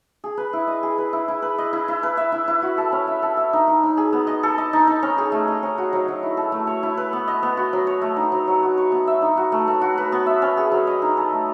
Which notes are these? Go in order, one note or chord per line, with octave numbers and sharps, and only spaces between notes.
G#4
B4
E4
D#5
G#4
B4
E4
E4
B4
D#5
E4
E4
B4
E5
E4
E4
F#4
A4
C#4
E5
A4
E5
D#4
D#4
D#4
G#4
B3
D#5
A4
D#5
D#4
D#4
C#4
G#4
A3
D#5
C#4
F#4
F#3
F#3
E4
A4
A3
C#5
E4
B4
B3
D#5
B3
F#4
F#3
C#5
A3
D#4
F#3
F#3
F#4
C#5
B3
E5
D#4
F#4
A3
A3
F#4
B4
B3
E5
C#4
G#4
F#3
D#5
D#4
A4
A3